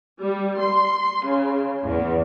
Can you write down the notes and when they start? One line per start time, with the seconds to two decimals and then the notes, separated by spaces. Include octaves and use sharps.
0.20 G3
0.60 C6
1.26 C#3
1.86 E2